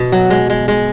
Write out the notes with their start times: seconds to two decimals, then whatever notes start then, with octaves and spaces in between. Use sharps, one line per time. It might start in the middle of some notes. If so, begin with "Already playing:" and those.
Already playing: B2
0.12 F#3
0.30 G#3
0.50 G#3
0.68 G#3